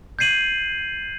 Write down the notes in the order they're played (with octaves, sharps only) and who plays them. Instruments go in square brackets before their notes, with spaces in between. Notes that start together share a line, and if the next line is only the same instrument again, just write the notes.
[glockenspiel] G6 G#6 C7 D#7 F#7